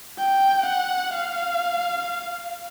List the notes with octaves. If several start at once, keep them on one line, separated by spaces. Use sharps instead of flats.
G5
F#5
F5